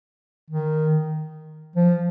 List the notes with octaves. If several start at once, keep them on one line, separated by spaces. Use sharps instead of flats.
D#3
F3